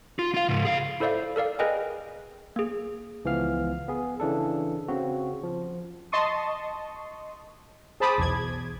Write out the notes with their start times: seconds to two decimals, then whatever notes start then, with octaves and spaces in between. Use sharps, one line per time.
0.19 F4
0.34 F4 F5
0.49 C#2 G#2
0.65 G#4 F5
1.00 E4 A4 C5 D5 E5 F5
1.36 A4 A#4 D5 F5
1.59 G#4 A#4 B4 D#5 G5 G#5
2.56 A#3 G#4
3.25 C#2 E3 F3 B3 F5 F6
3.88 B3 G#4
4.20 C#3 E3 D4 A4
4.88 C#3 C4 F#4
5.43 F3
6.12 D#5 A5 C6 C#6 D#6
8.00 G#4 C5 A5 B5 D6 D#6
8.18 B1 E2 G#6